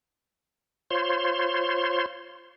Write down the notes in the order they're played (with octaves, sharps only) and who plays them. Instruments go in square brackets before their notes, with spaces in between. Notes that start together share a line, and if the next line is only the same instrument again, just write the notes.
[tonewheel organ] F4 C5 C#5 C6